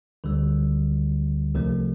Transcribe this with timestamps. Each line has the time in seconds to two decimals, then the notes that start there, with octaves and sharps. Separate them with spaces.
0.24 D2 D3 G3
1.55 C2 C3 F3 A3